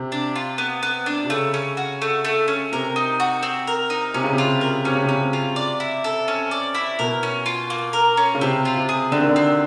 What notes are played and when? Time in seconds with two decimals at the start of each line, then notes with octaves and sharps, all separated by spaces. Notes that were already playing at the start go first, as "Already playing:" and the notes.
Already playing: C3
0.12 D4
0.36 F4
0.58 B3
0.83 B3
1.06 D4
1.25 C3
1.29 C#3 A3
1.54 C#4
1.77 F#4
2.02 A3
2.24 A3
2.48 C#4
2.72 C3 A#4
2.96 D#4
3.20 F#4
3.43 C4
3.67 A#4
3.90 D#4
4.14 C3 C#4
4.24 C#3
4.33 C3
4.38 F4
4.61 A#4
4.85 C3 C#4
4.95 C#3
5.04 C3
5.09 C#4
5.21 C3
5.33 F4
5.56 D5
5.80 E4
6.04 A4
6.28 C#4
6.51 D5
6.75 E4
6.99 B2 A#4
7.23 C#4
7.46 F4
7.70 A#3
7.93 A#4
8.17 C#4
8.35 C#3
8.41 C3 C4
8.65 F4
8.77 C3
8.89 G#4
9.12 D3 C4
9.21 D#3
9.29 D3
9.36 C4